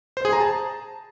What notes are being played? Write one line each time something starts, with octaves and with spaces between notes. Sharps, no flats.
C5
G#4
A#5
A5